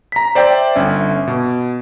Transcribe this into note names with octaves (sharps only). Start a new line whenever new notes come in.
A#5 B6
C5 D5 E5 G5
G1 C#4 E5
B2